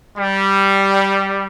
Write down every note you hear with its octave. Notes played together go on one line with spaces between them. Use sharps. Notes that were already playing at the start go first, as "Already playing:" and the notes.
G3